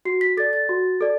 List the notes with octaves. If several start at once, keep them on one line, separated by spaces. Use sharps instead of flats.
F#4 C7
B6
A4 D5 A6
A6
F#4
A4 D5